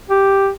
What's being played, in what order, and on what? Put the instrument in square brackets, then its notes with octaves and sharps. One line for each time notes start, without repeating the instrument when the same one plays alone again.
[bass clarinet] G4